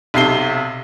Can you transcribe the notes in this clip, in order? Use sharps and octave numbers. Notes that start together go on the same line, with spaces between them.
B1 C3 C7 G7